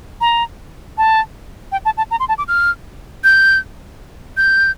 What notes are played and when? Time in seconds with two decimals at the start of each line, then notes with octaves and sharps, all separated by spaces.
0.21 A#5
0.98 A5
1.72 G5
1.85 A5
1.97 A5
2.11 A#5
2.20 C6
2.29 A5
2.38 D6
2.48 F6
3.24 G6
4.37 G6